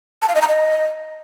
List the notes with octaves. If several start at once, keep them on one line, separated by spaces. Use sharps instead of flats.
A5
F5
D#5
A#5
D#5